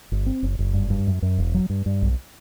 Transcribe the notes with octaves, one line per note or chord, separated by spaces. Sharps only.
G1
C4
F#1
F#1
G2
G2
F#2
F#2
E1
F#3
G2
G2
B1